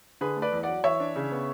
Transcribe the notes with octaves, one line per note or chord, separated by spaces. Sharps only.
D3 G#4 B4
A3
B4 D5
E2
F#3 D5 F#5
E3 C#5 E5
D4
C#3
B3